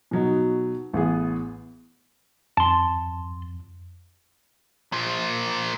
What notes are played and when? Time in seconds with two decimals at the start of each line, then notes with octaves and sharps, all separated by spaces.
0.11 B2 F#3 D#4
0.93 A1 B3 G#4
2.57 F2 A5 C6
4.92 A#2 F3